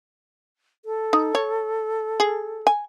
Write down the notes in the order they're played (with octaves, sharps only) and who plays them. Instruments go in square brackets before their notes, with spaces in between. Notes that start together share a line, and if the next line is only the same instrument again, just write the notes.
[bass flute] A4
[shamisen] D#4
C#5
G#4
G#5